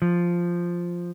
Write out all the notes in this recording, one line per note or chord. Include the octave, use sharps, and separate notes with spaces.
F3